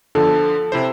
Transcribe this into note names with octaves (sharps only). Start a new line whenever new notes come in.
D3 F3 A4
C3 E4 C5